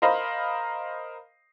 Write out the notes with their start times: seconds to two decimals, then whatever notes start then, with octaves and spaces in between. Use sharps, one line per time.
0.02 A#4 C5 D#5 F5 B5